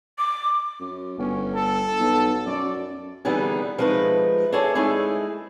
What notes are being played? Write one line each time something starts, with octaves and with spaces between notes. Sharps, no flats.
D6
F#2
G1 C#4
A4
B1
F#2 D5
D3 E3 G3 B3 D#4 G#4
F3 G#3 A3 D#4 B4
D4 E4 G#4 A4 C#5
G#3 A3 D#4 E4 G#4